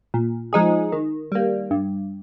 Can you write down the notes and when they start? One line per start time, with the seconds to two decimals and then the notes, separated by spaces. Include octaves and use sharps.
0.14 A#2
0.53 F3 G#3 D#4 G#4
0.92 D#3
1.32 G3 A#3
1.71 G2